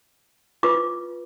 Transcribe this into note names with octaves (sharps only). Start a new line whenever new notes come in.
F4 B4 D6